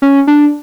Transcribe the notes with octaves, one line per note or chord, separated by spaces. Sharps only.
C#4
D4